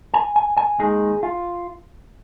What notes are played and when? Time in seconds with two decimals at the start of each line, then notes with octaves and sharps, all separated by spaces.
0.14 G#5
0.36 G#5
0.57 G#5
0.79 D#2 D#3 G#3 D#4 G#4
1.23 F4